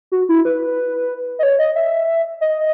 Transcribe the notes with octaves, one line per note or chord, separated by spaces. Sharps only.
F#4
E4
B4
D#5
C#5
D#5
E5
D#5